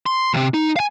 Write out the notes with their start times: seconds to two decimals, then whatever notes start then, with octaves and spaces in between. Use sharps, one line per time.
0.06 C6
0.34 D2 C3
0.54 D#4
0.76 F5 G#5